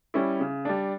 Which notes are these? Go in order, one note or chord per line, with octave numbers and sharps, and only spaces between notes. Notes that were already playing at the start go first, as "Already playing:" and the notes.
G3 C#4 E4
C#3
G3 D4